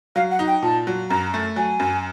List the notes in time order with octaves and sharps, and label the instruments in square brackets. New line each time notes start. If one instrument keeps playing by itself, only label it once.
[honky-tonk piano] F#3 [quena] F5
[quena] F#5
[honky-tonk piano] D#4
[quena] G5
[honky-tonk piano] A#2 [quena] A5
[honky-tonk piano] F#3
[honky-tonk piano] F#2 [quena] A#5
[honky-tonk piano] A3
[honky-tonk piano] F#3 [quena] G#5
[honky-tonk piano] F#2